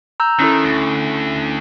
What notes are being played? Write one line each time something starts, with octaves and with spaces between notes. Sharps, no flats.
A#5 E6 G6
D#3 C#4 E4 A4
D2